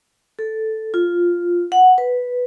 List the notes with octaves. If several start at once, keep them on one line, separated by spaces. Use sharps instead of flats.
A4
F4
F#5
B4